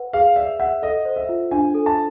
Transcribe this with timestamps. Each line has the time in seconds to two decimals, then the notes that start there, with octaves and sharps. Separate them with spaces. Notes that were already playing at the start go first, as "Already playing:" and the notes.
Already playing: B4 F#5
0.13 G#4 F5
0.36 D5 E5
0.60 E5 F#5
0.82 A4 D#5
1.05 C5
1.16 E5
1.29 F4
1.51 D4 G#5
1.74 A4
1.86 A5